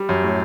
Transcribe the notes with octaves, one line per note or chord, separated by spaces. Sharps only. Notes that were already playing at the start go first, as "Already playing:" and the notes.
Already playing: G3
F#2
A2